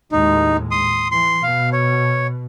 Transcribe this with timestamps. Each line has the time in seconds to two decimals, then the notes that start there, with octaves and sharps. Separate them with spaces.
0.12 D#2 A2 G#3 D#4
0.71 C6 D#6
1.11 E3 C6
1.43 B2 F5
1.73 C#5